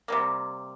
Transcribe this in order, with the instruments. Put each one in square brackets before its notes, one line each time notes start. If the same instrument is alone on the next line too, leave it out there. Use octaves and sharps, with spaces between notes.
[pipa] C3 G3 A#3